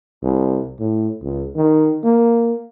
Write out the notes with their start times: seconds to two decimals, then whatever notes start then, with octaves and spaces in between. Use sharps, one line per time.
0.23 C2
0.79 A2
1.23 C#2
1.56 D#3
2.04 A#3